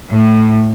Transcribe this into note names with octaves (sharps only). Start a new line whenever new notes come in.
A2